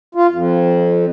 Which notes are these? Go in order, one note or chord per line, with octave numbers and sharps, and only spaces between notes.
F4
F2